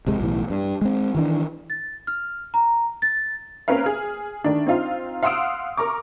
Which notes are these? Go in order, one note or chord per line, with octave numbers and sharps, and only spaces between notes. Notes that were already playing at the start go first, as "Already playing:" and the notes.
D1 C3 G#3
B1 A2 E3
G2
G#3 C4
D#3 E3 D4
A6
F6
A#5
A6
A#3 C4 C#4 A#4 B4 F5
G#4 F6
D#3 A3 D4
C4 D#4 F4 F5
F5 F#5 C6 D#6 E6 D7
A#4 A#5 C#6 D6